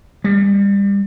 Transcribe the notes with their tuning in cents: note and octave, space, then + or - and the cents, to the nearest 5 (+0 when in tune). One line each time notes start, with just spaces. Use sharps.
G3 +30